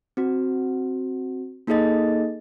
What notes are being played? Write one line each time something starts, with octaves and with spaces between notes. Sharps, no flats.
C4 F#4
A#3 D#4 G#4 A4 D#5 A6